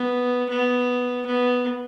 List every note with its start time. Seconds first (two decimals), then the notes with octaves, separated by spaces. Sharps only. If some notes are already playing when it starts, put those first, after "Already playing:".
Already playing: B3
0.49 B3
1.26 B3